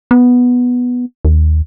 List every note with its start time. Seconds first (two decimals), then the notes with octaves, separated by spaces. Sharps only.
0.11 B3
1.25 D#2